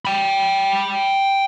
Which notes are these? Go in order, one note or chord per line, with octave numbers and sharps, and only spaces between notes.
G5 B5